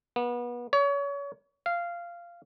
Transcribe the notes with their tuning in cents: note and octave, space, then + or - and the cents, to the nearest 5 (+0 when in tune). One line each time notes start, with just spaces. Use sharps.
B3 -30
C#5 +30
F5 -15